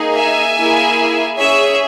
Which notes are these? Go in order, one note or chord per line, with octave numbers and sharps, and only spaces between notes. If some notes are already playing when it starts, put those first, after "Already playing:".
Already playing: A#3 D#4 G#4
E5 G#5
A#3 E4 G#4
C#4 G#4 C#5 E5